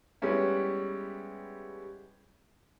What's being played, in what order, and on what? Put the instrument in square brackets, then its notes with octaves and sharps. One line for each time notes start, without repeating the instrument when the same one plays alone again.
[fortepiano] G3 G#3 B3 C#4 E4